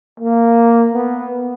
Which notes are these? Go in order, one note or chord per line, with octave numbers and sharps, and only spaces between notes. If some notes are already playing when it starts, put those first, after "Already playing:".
A#3
B3